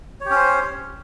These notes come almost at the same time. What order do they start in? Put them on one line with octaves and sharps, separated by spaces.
C#5 G4 C#4 C5